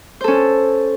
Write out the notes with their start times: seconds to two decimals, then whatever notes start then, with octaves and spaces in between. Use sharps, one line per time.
0.21 C5
0.24 A4
0.28 C#4